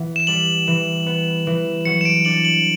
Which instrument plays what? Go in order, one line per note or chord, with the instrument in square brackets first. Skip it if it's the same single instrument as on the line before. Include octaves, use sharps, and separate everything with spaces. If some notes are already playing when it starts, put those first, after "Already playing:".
Already playing: [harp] E3 B3
[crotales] E7
[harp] G3 [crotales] F#7
[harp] E3
B3
E3
[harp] F#3 [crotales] C#7
[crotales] E7
D7
[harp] D4 [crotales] F#7
[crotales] F#7